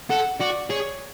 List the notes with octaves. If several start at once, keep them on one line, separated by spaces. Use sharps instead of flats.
A4 F#5
F#4 D5
G#4 C#5